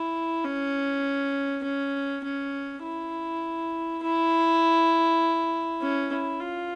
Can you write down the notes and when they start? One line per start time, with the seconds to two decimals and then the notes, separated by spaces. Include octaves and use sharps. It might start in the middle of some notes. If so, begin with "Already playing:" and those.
Already playing: E4
0.45 C#4
1.63 C#4
2.24 C#4
2.83 E4
4.02 E4
5.81 C#4
6.11 E4
6.40 F4